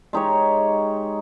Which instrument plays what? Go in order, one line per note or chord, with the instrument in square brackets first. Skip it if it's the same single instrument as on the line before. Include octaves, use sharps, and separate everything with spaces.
[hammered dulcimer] G#3 D#4 G4 C#5